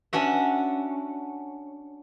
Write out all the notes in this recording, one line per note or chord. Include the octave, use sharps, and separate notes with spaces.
C#4 D4 F#4 E5